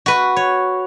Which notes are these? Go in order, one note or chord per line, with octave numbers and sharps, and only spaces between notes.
F#4 B4
C#5